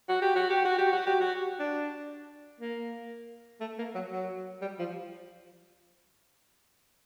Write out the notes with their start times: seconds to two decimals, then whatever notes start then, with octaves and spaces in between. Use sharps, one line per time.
0.09 F#4
0.22 G4
0.36 F#4
0.50 G4
0.65 F#4
0.78 G4
0.92 F#4
1.07 G4
1.21 F#4
1.60 D4
2.61 A#3
3.61 A3
3.79 A#3
3.95 F#3
4.12 F#3
4.62 G3
4.79 F3